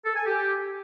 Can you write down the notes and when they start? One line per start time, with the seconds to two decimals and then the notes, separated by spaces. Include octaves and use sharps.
0.05 A4
0.16 G#5
0.26 G4